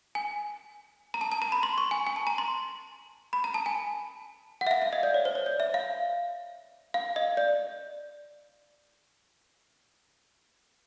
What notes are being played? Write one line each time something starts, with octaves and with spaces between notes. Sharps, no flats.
G#5
A#5
A5
A5
A#5
B5
C6
C#6
G#5
G#5
A5
A#5
C6
B5
A#5
A5
G#5
F#5
E5
F5
E5
D#5
D5
C#5
C5
C#5
D5
E5
F5
F5
D#5
D5